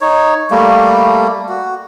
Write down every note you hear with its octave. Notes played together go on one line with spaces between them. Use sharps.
D#4 C#5
G3 A3 A#3
F#4